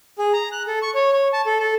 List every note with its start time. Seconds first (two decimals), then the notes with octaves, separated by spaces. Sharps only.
0.19 G#4
0.33 A#5
0.52 F#6
0.67 A4
0.82 C#6
0.95 C#5
1.13 C#5
1.33 A5
1.46 A4
1.60 A4